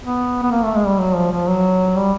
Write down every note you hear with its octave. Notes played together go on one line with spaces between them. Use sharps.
B3
B3
A#3
A3
G#3
G3
F#3
F3
F3
F#3
G3